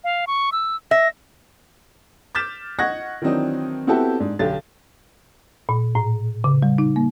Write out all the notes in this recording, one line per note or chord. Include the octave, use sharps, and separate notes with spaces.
F5
C#6
E6
E5 A#6
D6 F6 G6 A6 B6 E7
D#5 F#5 C#6 F#6 G#6 A#6
D#3 E3 F#3 C4 D4 D#4
B3 C4 E4 F#4 G4 A4
G#2 D4
B1 D3 G4 A6
A#2
A2
C#3
G3
D#4
A#3